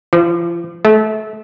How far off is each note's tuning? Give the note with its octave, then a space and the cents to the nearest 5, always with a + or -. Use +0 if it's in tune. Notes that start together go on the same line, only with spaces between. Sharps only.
F3 -40
A3 -30